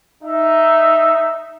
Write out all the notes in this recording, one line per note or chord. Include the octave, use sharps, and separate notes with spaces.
D#4 E5